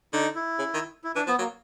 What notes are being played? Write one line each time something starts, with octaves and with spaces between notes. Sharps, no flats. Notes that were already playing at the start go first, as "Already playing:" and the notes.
D3 D#4
E4
C#3
D#3
E4
E3 D4
F3 B3
F#3 A#3